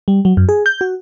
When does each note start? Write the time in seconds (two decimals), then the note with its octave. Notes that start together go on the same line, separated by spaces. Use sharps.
0.08 G3
0.25 F#3
0.37 F#2
0.49 G#4
0.66 G6
0.81 F#4